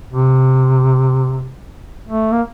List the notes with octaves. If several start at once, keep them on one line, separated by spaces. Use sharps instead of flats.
C3
A3
A#3